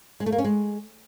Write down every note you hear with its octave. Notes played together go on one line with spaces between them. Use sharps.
G#3
A3
A#3
C#4
G#3